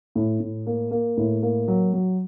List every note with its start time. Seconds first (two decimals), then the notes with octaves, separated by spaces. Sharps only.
0.15 A2
0.40 A2
0.66 A#3
0.91 A#3
1.17 A2
1.43 A#3
1.68 F#3
1.93 F#3